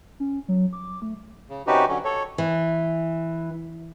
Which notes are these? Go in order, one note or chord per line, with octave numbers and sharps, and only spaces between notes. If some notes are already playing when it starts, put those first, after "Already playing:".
C#4
F#3
D6
A3
C#3
C3 C#4 D#4 F#4 G4 B4
D3 F#3 C#4
A4 C#5
E3